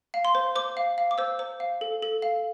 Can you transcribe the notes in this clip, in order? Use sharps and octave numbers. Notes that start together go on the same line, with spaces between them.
F5
C6
C5
C5 D6
F5
F5
D6
C5 E6
C5
F5
A4
A4
F5